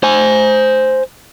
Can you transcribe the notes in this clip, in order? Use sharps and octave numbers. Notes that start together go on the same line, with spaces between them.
C5 G#5